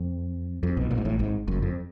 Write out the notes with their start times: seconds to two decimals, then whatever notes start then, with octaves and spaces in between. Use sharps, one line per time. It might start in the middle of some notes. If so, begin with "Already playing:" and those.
Already playing: F2
0.63 F2
0.77 B1 B2
0.91 A#1 A#2
0.98 G#2
1.05 A1 A2
1.19 G#1 G#2
1.48 F#1 F#2
1.62 F2